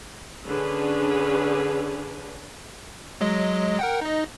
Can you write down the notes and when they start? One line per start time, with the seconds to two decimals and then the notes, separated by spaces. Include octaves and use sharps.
0.44 D3 C#4 D4 G#4 B4
3.21 F#3 G#3 D#5
3.79 A#4 F#5 G5
4.01 D#4 D#5